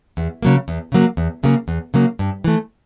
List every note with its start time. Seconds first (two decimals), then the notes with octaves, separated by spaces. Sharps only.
0.17 E2
0.42 C#3 F#3 A#3
0.68 E2
0.92 C#3 F#3 A#3
1.17 E2
1.43 C#3 F#3 A#3
1.68 E2
1.94 C#3 F#3 A#3
2.19 G2
2.44 E3 A3